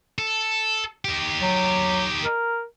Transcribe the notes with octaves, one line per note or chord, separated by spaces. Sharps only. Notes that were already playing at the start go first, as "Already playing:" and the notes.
A4
D#4 G4
F#3
A#4